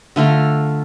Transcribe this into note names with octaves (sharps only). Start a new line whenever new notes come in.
D3 A3 F4 A#5